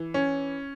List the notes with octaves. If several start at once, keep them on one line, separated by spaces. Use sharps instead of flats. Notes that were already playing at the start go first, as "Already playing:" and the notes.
Already playing: E3
C#4